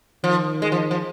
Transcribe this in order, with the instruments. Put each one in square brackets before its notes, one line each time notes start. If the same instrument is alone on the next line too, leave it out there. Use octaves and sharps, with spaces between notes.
[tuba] D#3 [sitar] F3
[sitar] G#3
F3
F3